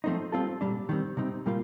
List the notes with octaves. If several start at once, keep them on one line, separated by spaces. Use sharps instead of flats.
F3 A3 C4 D#4
G3 C4 F4 A4
A#2 G3 D4
D#3 G3 C4
C3 G3 C4 D#4
A#2 G3 A#3 F4